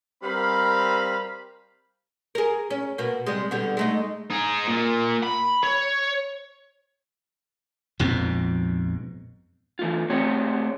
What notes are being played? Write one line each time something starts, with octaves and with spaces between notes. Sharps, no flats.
G3 C4 A#4 F5 B5
G#4 A#4
C#4
B2 A#3
C3 G3 G#3
B2 D3 G3
G#3 A3 D#4
D#4 G#4
A#2
B5
C#5
A#1 F2 G#2 B2
E3 A3 F4
A3 C4 G4 G#4 C#5